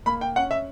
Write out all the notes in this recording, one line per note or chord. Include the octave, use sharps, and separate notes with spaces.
A#3 B5
G5
C#4 F#5
E5